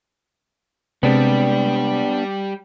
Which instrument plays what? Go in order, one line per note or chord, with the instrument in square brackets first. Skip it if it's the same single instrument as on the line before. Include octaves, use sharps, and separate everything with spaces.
[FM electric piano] C3 G#3 C4 [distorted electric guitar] G3 [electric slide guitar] B3 D4